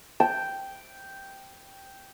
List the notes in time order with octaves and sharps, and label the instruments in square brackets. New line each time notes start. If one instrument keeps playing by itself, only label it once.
[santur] G5 [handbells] A5